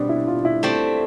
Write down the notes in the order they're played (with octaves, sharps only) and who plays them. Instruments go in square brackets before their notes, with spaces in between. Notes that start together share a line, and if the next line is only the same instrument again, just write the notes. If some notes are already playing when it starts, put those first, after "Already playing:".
Already playing: [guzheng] B2 G3 C4 [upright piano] D4
[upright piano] E4
F4
E4
[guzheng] A3 C4 G4 D5